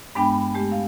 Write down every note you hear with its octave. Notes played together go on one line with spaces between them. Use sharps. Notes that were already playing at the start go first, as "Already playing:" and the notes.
G2 G#3 B3 D4 G5 B5
G#3 A3 G4
F5